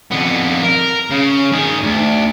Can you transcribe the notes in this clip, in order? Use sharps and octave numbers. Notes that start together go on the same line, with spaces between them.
F2 B3
A#4
C#3
D#3 G#4
D2